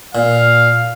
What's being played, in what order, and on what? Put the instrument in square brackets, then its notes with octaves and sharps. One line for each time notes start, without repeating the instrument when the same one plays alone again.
[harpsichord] A#2 [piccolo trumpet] F5